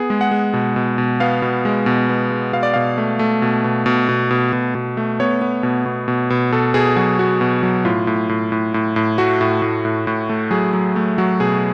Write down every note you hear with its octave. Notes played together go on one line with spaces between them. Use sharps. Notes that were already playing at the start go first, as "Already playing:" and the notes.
Already playing: B3 G#4
G#3
F#5
G#3
B2
B2
B2
B3 F5
B2
G#3
B2
B3
G#3
B2 F5
D5
B2 F5
A3
A3
B2
B2
B2
B2
B2
B2
B2
A3
B3 C#5
B3
B2
B2
B2
B2
B2 A4
B2 G#4
F#3 F#4
B3 F#4
B2
F#3
A2 F4
A2
A2
A2
A2
A2
A3 F#4
A2
A2
A2
A2
A3
F#3 G#4
F#3
A3
F#3 F#4
B2 G#4